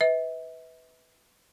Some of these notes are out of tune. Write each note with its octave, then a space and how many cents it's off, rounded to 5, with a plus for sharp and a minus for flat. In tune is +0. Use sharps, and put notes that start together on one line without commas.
B4 +10 E5 -40